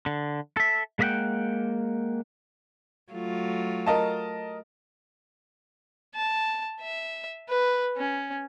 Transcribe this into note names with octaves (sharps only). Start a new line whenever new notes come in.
D3
A4 E5
G#3 A#3 D#5 E5 F#5 G5
F#3 A3 F4
A#4 D#5 A5
A5
E5
B4
C#4